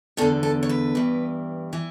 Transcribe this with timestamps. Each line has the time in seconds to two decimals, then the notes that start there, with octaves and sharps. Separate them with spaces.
0.17 E2 A4
0.21 D3
0.43 A4
0.63 C#5
0.69 B4
0.95 G2 E3
1.73 E3